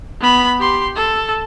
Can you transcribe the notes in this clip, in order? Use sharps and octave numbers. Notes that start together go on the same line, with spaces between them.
B3 B5
G4 C6
A4